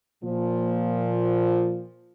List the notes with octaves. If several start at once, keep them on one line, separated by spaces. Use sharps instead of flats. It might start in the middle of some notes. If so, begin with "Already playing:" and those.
A#2 F3